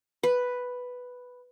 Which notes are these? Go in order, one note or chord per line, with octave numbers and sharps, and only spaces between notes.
B4